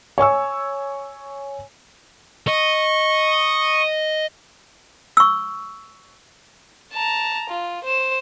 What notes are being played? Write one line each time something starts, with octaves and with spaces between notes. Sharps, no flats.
C#5 G#5 C#6 E6
D#5 C#6
C#6 E6
A5 A#5
F4
C5 E7